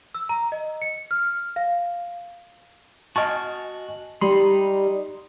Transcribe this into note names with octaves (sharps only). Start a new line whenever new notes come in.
E6
A#5
D#5
C#7
F6
F5
F#4 D#5 G#5 A5 C#6 F6
G3 D#4 B5 C6